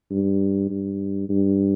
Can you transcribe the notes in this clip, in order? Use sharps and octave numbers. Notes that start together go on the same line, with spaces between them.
G2
G2
G2